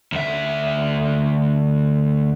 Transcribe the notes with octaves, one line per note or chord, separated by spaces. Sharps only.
D2 E5